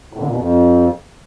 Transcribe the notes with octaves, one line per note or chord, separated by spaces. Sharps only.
A2
D3
A#2
B2
F2